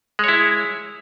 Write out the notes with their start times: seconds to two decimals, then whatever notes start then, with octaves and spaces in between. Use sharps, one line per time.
0.19 G#3
0.24 C#5
0.28 E4